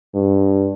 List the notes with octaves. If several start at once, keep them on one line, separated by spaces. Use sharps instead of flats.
G2